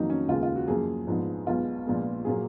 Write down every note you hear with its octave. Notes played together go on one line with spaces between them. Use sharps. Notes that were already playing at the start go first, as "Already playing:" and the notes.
Already playing: F2 D#3 F#3 A#3 D#4
C#4
D#2 C#3 G#3 B3 F4
F4
F#4
F#2 F3 A#3 G#4
A#1 G#2 F3 B3
B1 B2 G#3 B3 F4
A#1 A#2 G#3 B3
A#2 F#3 A#3 G#4